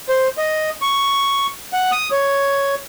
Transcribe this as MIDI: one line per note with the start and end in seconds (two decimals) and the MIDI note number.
0.09 0.28 72
0.38 0.70 75
0.82 1.47 85
1.73 1.91 78
1.92 2.09 87
2.12 2.75 73